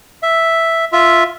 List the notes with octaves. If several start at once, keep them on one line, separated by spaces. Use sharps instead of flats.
E5
F4 E5